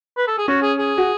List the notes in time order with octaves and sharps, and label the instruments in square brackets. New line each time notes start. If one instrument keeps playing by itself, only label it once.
[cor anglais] B4
A4
G#4
[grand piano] C#4 [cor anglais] F#4
[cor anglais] G#4
G#4
[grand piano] F#4